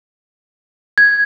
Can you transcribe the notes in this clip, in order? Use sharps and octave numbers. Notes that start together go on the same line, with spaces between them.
G#6